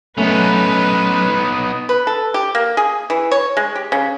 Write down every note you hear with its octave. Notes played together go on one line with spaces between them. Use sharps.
F#2 A3 B3 C#4 D#4 B4
B4
A4
G4
A#3
G#4
E3
C#5
G#3
G4
C#3